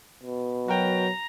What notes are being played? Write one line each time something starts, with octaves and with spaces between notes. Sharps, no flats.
B2
F#3 F#4 A#4 G5 A#5